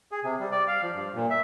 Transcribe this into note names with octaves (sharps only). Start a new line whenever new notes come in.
G#4
C3
G3
D5
F5
F3
G2
A#2
E5